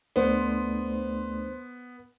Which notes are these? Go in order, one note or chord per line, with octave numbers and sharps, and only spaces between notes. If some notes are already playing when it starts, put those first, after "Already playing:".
D2 A3 B3 D4 C5 C6